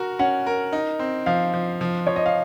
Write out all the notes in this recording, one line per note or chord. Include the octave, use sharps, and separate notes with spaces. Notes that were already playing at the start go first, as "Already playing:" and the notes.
Already playing: F#4 A#4
C#4 F#5
A#4
D#4
C4
F3 F5
F3
F3
F3 C#5
D#5
F5